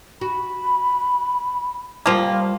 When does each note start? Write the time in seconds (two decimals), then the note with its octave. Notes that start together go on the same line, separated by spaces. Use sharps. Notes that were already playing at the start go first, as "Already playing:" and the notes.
0.21 F#4 B5
2.06 F3 G3 A#3 F4 C5